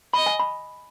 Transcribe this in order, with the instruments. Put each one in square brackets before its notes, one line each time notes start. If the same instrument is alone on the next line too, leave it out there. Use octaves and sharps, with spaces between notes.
[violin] D#5 [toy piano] B5
[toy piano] G#5
B5